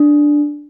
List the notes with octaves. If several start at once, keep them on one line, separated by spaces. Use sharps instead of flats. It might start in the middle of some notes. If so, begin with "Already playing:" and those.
Already playing: D4